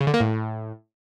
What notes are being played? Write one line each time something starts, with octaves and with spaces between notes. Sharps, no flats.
C#3
D3
A#3
A2